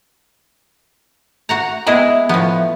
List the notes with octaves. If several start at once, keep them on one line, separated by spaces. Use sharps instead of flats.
F#4 F#5 A#5
G#3 B3 E4 G#4 D#5 G5
A2 F3 B3